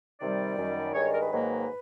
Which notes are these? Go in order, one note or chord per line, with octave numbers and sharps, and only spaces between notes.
C3 D#3 G3 D5
F#2 D#3 G3
G2 D#3 G#3 C#5
D5
A#4
B4
G#2 D#3 F#3 A#3